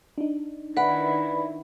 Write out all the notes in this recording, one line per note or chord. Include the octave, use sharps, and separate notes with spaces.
D4 D#4
D#3 E4 B4 D5 F#5 B5